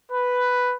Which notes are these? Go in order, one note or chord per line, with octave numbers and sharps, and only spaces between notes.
B4